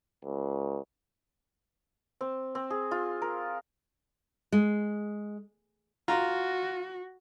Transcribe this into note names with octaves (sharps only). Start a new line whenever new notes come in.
C#2
C4
C4
G#4
F4
A#4
G#3
F4 F#4 A#5